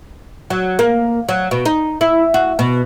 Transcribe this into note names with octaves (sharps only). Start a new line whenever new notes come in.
F#3
A#3
F#3
B2
D#4
E4
F#4
B2